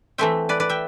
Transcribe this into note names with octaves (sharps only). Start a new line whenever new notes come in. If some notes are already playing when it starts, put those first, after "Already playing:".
E3 A3 C4 E5 G5
B4 D5
B4 D5
E5 G5